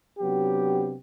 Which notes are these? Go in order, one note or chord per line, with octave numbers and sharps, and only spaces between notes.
C3 F#3 B3 D4 G4